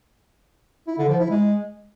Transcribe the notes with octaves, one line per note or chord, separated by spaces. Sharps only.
E4
D3
F3
E4
G#3